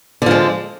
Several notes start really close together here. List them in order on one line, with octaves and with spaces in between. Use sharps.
D3 F3 G#3